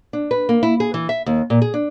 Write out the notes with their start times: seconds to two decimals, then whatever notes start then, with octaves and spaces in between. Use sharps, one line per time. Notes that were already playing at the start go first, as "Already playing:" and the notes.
0.13 D4
0.31 B4
0.49 A#3
0.63 E4
0.80 G#4
0.94 E3
1.09 E5
1.26 D#2
1.50 A#2
1.62 G#4
1.74 D4